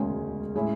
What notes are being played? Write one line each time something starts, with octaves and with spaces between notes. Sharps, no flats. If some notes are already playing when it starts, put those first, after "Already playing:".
Already playing: E1 D2 C#3 G#3 C#4
A2 G#3 C#4 E4